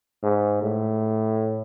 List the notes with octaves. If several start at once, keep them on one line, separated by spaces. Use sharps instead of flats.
G#2
A2